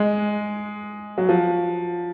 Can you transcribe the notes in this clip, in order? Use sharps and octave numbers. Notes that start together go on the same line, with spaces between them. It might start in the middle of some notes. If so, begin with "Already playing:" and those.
Already playing: G#3
F#3
F3